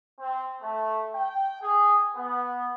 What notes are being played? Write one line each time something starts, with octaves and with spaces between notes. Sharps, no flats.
C4
A3
G5
G#4
B3